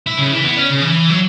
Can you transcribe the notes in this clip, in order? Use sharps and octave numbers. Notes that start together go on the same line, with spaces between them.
E4
C#3
E3
B3
C#4
C#3
E3
F#3